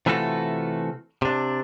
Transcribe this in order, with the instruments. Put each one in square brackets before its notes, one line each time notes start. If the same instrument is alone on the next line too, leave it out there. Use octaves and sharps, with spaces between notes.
[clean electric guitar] C3 E3 A3 F4 F#4 A4
C3 D4